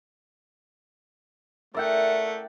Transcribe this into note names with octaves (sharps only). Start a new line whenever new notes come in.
A3 A#4 D5 E5 F#5 G5